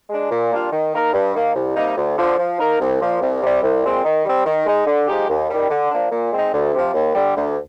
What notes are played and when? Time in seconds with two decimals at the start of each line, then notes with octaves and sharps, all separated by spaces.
0.10 G#3 D4
0.31 A#2
0.51 G3 A#3 D4 F4
0.71 D#3
0.93 A#3 D#4 A#4
1.13 G2
1.34 D#3 A#3
1.55 C2
1.76 C3 G3 A#3 D#4
1.96 D2
2.17 D3 F3
2.38 F3
2.59 A#3 D#4 A#4
2.80 C2
3.00 A#2 F3
3.21 C2
3.42 C3 G3
3.62 C2
3.83 A#2 G#3 C4
4.04 D#3
4.24 G3 C4
4.46 D#3
4.66 G#3 D#4
4.87 D3
5.08 F3 G#3 D#4 G4
5.29 D#2
5.49 D#3 G3
5.70 D3
5.91 F3 A#3 D4
6.11 A#2
6.32 G#3 C4 D#4
6.53 D2
6.74 C3 F3
6.94 D#2
7.15 D3 G3
7.36 D2